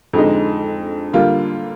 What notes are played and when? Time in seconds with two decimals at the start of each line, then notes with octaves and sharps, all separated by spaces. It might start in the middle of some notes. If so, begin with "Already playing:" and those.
0.13 F2 D3 G#3 D#4
1.13 D3 G3 A#3 F4